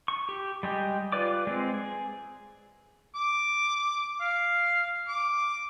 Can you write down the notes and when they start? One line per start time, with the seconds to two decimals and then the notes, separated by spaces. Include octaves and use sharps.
0.08 C#6
0.29 G4
0.63 G3 G#3 G4
1.12 F4 B4 D5 D6
1.47 G#3 C4
1.74 G#4
3.15 D6
4.20 F5
5.08 D6